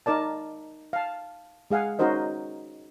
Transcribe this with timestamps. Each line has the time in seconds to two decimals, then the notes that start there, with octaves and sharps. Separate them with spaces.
0.06 D#4 A#4 D5 A5
0.93 F5 A5
1.71 G#3 G#4 F5 F#5 G#5
1.99 C#4 D#4 F#4 A#4 C5 D#5